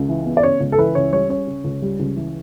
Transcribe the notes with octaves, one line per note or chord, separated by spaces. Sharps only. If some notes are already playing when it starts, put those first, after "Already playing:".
Already playing: C#2
E3
B3
D5
C#3 C#5
C#2
A4
E3 B4
C#2 C#5
G3 C#5
C#4 C#5
C#3
C#2
G3
C#2
E3